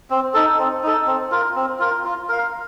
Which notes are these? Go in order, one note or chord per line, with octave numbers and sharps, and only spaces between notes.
C4
D#4 A4
C4
D#4 A4
C4
F4 A#4
C4
F4 A#4
F4
A#4 F5